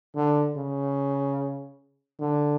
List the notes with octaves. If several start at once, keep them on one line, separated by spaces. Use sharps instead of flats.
D3
C#3
D3